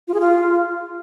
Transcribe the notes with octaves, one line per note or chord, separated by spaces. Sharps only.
F4
G#4
F4